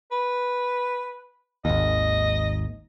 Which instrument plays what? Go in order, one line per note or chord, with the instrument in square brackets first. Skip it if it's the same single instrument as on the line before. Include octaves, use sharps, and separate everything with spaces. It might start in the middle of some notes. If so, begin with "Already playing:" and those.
[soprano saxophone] B4
[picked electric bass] G#1 D#2 [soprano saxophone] D#5